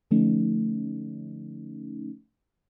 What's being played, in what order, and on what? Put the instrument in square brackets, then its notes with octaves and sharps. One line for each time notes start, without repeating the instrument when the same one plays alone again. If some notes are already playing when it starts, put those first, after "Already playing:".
[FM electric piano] D3 F3 A3 C#4 D#4